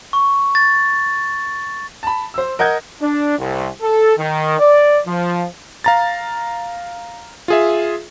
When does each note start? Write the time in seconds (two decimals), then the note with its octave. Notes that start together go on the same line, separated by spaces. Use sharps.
0.13 C#6
0.55 A6
2.03 A5 B5
2.34 C5 E6
2.59 A#4 D#5 F#5 G6 G#6
3.01 D4
3.38 C2
3.82 A4
4.17 D#3
4.59 D5
5.06 F3
5.84 F5 A#5 A6
7.48 F4 G#4 E5